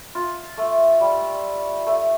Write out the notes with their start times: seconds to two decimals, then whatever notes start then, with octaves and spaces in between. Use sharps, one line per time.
0.15 F4
0.58 A3
1.01 G3
1.87 A3